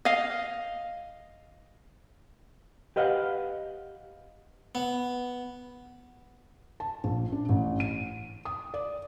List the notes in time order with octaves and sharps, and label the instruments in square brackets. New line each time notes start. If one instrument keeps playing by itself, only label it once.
[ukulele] D#5 F5
[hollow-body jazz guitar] G4 B4 D#5 F5 F#5
[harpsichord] B3
[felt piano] A5
A#1
D4
A1
D#7
D#6
D5